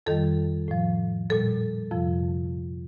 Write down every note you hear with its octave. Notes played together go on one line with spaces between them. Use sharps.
F2 D#3 G3 A4
A2 F3
A#2 G3 A4
F2 C3 F3